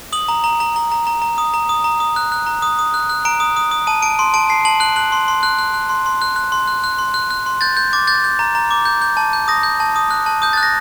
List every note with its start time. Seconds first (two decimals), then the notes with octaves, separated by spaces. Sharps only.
0.13 D#6 F#7
0.28 A#5
0.44 A#5
0.60 A#5
0.76 A#5
0.92 A#5
1.07 A#5
1.22 A#5
1.38 D#6
1.54 A#5
1.69 D#6
1.84 A#5
2.00 D#6
2.16 F#6
2.32 F#6
2.46 A#5
2.62 D#6
2.79 D#6
2.94 F#6
3.10 F#6
3.25 A#5 D7
3.40 D#6
3.56 D#6
3.71 D#6
3.87 A5 D#7
4.02 A5 D7
4.19 C6 D7
4.34 A5 D7
4.49 A5 C7
4.65 A5 F#7
4.80 F#6 F#7
4.96 F#6 F#7
5.12 C6
5.28 C6
5.43 F#6
5.59 F#6
5.74 F#6
5.89 C6
6.06 C6
6.22 F#6
6.36 F#6
6.52 C6
6.68 F#6
6.84 F#6
6.99 C6
7.14 F#6
7.31 F#6
7.46 C6
7.61 G6 A6
7.77 G6
7.93 D6 A6
8.07 G6 A6
8.24 G6
8.39 A#5
8.55 A#5
8.71 D6
8.85 G6
9.02 G6
9.17 A5
9.33 G6
9.48 D#6 A#6
9.63 G6
9.80 A5
9.96 D#6
10.11 F#6
10.26 A5
10.42 D#6 G6
10.53 F#6 A6
10.63 A#6